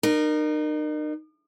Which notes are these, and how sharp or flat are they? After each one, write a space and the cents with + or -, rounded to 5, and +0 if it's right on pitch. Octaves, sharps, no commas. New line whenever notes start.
D#4 -40 A#4 +0